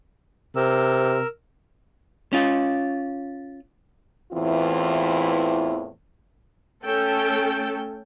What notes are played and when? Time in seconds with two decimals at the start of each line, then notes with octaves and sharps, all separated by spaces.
0.56 C3 A#4 E6
2.33 C#4 F4
4.32 E2 A2 E3 C4 E4 F4
6.83 A3 C#4 A4 G5